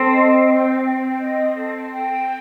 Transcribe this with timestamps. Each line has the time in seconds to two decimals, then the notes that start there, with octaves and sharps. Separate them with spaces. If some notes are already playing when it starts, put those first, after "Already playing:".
Already playing: C4 A4
0.12 D#5
0.48 G5
0.84 G5
1.20 D#5
1.56 A4
1.91 G5